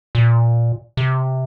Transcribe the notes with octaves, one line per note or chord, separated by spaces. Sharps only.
A#2
C3